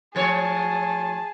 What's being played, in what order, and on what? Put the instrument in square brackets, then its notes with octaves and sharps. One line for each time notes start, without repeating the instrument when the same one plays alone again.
[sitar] A2 F3 C#5 [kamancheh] G#4 A5